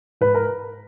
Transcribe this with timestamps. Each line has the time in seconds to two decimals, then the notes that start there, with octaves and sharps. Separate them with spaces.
0.21 G#2 B4
0.34 A#4